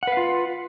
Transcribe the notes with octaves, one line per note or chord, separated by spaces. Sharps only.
F4 B4 F5 F#5